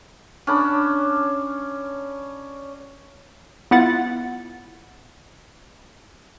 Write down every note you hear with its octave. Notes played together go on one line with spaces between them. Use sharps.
C#4 D4 A5 B5
B3 E4 F4 F#5 A6